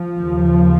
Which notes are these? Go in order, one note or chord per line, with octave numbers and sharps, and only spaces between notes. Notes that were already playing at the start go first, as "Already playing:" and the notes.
Already playing: F3
D#2 C#3